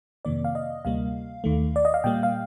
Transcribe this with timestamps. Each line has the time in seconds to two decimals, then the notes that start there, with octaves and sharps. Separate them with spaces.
0.25 F2 C3 D#3 A#3 D5
0.45 F5
0.55 D#5
0.85 D2 C3 G3 A#3 F5
1.44 D#2 D#3 A3
1.76 D5
1.85 D#5
1.94 F5
2.04 A#2 G3 A#3 G5
2.23 F5